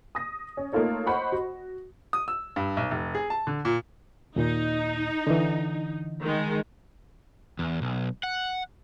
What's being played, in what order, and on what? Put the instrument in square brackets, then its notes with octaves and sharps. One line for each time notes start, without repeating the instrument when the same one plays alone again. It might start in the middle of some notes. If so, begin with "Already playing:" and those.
[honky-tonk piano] D#6 A#6
C#4
A3 A#3 D#4 F4 A4 C#5
C5 D#5 F#5 B5 C#6
F#4
[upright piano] D#6
E6
G2
B1
F1
G#4
A5
D3
A#2
[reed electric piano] D#2 A#2 [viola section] D#4
[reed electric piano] D3 E3
[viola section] D#3 G#3
[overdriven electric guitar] E2
B1
F#5